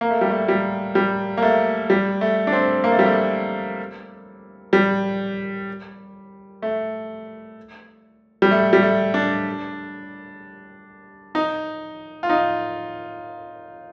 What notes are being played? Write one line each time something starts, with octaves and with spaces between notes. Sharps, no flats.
A#3
A3
G3
A3
G3
G3
A#3
A3
G3
A3
D4
C4
A#3
A3
G3
A3
G3
A3
G3
A3
G3
A3
D4
D#4
F4
D#4